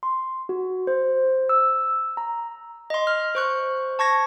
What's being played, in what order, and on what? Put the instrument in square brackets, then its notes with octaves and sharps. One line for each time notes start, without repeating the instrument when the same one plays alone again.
[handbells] C6
F#4
C5
E6
A#5
D#5 C6
F6
C5 C#6 F#6
A5 C#6 G#6 A#6